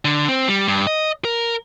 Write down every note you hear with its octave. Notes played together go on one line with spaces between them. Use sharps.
D3
C4
G3
G2
D#5
A#4